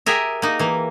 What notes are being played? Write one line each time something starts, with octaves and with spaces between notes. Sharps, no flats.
G4 G#4 A#4 E5
A#3 D#4
E3 A#3